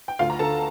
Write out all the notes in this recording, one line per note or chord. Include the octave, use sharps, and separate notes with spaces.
G5
D2 F4 F5
A#5
D3 A4 A5